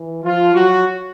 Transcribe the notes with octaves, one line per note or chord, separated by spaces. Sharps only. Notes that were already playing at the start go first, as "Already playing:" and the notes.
Already playing: E3
F3 F4
F#3 F#4